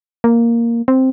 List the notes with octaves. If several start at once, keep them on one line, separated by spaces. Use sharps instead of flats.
A#3
C4